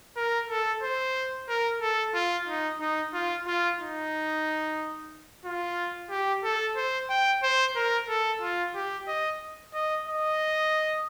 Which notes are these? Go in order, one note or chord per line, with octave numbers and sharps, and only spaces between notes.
A#4
A4
C5
A#4
A4
F4
D#4
D#4
F4
F4
D#4
F4
G4
A4
C5
G5
C5
A#4
A4
F4
G4
D#5
D#5
D#5